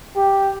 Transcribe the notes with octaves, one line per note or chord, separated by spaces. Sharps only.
G4